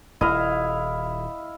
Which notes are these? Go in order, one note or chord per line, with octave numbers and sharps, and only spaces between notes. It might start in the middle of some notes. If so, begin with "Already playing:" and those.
D#1 E4 D#5 F5